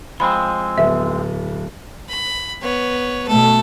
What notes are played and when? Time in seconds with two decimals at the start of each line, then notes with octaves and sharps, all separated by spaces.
0.20 F3 G#3 C4 B5
0.78 D1 B3 E5
2.09 B5
2.62 B3 C#5
3.28 B2 A3 A4